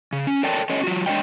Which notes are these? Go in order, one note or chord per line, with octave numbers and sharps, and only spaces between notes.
C#3
C#4
A4 A#4 C#5 D5 G5 A5
C#4 A4 C#5 D#5
F#3 F4 F#4
G#3 D4 F4 C#5 D#5 G5